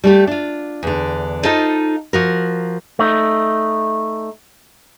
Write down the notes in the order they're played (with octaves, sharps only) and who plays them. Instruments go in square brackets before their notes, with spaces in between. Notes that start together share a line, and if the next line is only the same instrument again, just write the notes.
[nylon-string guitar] G3 A3 G4
D4 F4
E2 D3
D#4 F4 A4 C5 D#5
F3 F#4 A#4
[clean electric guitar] A3 D#4